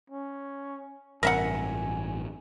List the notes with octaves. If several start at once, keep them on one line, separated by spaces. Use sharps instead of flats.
C#4
A1 G2 C3 A#4 E5 F#5 G#5